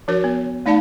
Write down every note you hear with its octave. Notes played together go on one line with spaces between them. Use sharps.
F3 D4 F#4 A#4 C#5
B3
A3 D#4 D5 F5 A5 B5